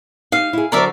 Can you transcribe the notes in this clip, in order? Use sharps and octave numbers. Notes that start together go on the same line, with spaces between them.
D#4 G4 F5
E4 G#4
D3 F#3 A#4 C5 D5 E5